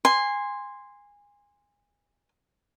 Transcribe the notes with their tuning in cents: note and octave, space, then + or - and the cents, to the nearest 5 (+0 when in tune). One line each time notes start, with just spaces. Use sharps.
G#5 -20 C6 +0